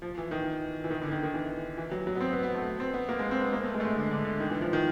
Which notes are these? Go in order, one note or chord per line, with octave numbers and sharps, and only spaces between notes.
F3
E3
D#3
E3
D#3
D3
D#3
D#3
E3
E3
F#3
F#3
B3
C4
B3
B3
A3
C4
B3
A#3
G#3
C4
B3
A#3
A3
G#3
A3
G#3
D3
D3
D3
D#3
E3
F3
D#3